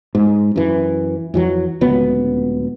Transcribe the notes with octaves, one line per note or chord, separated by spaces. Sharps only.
G#2
F#2 E3
F2 E3 F#3
D1 C#2 F#3 B3